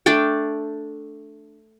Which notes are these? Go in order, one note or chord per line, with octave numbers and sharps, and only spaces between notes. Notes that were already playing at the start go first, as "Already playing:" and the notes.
A3 D4 D5 G5